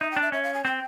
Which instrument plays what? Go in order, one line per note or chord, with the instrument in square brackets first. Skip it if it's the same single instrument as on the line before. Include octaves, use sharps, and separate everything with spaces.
[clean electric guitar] D#4 [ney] E5
[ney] G5
[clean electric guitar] D4
[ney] E5
[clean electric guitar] C#4 [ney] E5
[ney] F5
G#5
[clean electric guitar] C4 [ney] G5